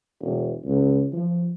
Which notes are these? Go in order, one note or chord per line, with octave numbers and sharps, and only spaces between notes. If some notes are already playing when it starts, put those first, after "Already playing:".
E1
C#2
F3